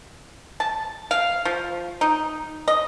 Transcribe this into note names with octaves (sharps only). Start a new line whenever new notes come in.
A5
F5
F3
D#4
D#5